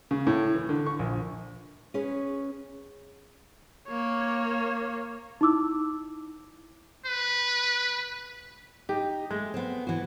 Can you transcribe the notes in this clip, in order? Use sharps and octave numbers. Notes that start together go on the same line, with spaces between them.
C#3
A2
E3
D3
C#6
A#1
C#4 G#4 B4 C#5
A#3 C#5
D#4 E4 D6 E6
B4
D#4 G4
G#3 A3
B3 C4
E3 F#4